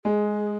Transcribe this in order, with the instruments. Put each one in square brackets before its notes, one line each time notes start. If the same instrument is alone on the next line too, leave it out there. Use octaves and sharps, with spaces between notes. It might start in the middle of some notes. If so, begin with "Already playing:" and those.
[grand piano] G#3 [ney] G#4